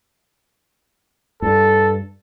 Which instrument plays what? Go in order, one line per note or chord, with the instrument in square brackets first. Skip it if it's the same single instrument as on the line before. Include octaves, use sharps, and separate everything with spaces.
[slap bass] G2 [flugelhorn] A4